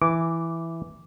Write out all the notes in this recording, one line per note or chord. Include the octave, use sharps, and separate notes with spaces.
E3 D6